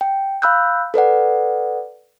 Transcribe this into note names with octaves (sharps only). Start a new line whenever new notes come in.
G5
F5 B5 E6 F#6 G6
A4 B4 D5 F#5